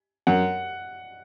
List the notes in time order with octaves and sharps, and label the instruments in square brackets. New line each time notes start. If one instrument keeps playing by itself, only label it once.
[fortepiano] F#2 [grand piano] F#5